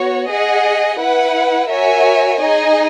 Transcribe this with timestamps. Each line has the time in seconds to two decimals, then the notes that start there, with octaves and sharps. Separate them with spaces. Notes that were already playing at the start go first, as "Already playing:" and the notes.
Already playing: B3 F#4 C#5
0.30 G#4 D#5 F#5
1.00 E4 B4 F#5
1.70 F#4 A#4 C#5 E5 G#5
2.42 D#4 G#4 D#5 G#5